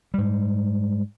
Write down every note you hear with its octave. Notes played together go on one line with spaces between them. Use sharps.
G#2 G3